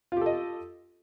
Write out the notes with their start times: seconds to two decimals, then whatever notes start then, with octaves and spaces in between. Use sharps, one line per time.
0.12 F4
0.17 G4
0.21 A4
0.26 D#5